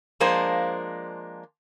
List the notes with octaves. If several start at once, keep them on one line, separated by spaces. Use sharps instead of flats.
F3 G#3 A#3 D4 C5